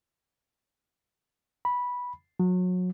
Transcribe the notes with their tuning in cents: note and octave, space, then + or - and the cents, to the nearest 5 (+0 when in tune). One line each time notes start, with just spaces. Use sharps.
B5 -10
F#3 -30